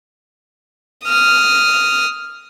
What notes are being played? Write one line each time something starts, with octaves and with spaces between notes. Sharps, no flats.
D#6 F6